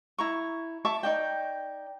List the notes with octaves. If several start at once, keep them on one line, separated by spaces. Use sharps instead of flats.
E4 A#5 C#6
E5 A5 C#6 D6
D#4 D5 G5